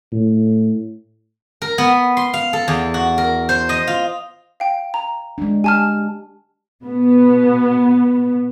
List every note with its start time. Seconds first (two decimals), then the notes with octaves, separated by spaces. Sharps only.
0.12 A2
1.62 A#4
1.78 B3
2.17 C6
2.34 F5
2.53 A4
2.68 E2
2.94 F#4
3.18 A#4
3.49 C5
3.69 D#5
3.87 F4
4.60 F5 G5
4.94 A#5
5.38 G#3 D4
5.64 G4 G#5 A5 F6
6.83 B2 B3